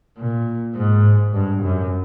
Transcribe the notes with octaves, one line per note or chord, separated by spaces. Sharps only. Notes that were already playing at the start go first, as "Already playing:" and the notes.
A#2
G#2
G2
F#2